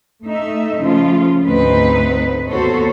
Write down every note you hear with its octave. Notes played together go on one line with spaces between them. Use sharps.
A3 D#4 E5
C#3 F3 A3 F4
D2 G#2 C4 D#4 B4
D#2 B3 F#4 A4 C5 C#5